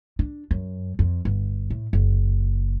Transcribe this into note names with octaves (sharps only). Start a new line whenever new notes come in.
D4
F#2
F2
G1
A2
F#1